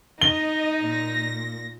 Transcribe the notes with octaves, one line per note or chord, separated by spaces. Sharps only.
D#4 D#5 G7
A#2 A#6